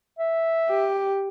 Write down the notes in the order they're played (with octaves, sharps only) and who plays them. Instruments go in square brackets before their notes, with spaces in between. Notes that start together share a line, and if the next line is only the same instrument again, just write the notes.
[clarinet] E5
[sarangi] G4